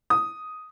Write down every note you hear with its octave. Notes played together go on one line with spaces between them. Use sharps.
D#6